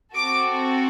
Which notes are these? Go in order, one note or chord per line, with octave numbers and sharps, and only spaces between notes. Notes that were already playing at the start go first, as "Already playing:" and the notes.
C4 F#4 A4 D6